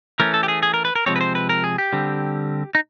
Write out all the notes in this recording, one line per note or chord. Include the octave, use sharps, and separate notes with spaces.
E3 A3 C#4 A#4
A4
G4
G#4
G#4
A#4
B4
A#4
C3 F3 G#3 C4 C#5
B4
C5
B4
A#4
G#4
G4
D3 G3 C4
D#4